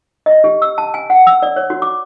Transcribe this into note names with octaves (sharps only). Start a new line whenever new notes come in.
D#5
G4
E6
A5
G#5
F#5
E6
D5
C#5
F#4
D6